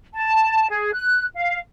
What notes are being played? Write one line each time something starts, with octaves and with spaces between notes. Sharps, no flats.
A5
G#4
F#6
F5